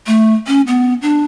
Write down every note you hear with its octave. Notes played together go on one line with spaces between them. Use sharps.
A3
C#4
B3
D4